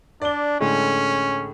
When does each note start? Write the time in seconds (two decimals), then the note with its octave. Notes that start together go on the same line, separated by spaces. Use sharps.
0.22 D4 D5 G7
0.61 A2 D3 G#3 C#4